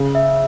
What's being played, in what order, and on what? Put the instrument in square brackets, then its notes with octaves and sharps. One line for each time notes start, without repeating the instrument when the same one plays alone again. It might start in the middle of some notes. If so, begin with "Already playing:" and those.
Already playing: [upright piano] C#3
[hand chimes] E5